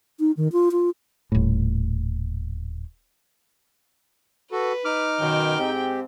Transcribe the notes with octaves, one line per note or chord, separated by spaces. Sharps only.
D#4
D#3
F4
F4
D#1 A2
F#4 A4 B4
D#4 D6 F6
F#2 B2 D#3 G5
G#2 C4 G4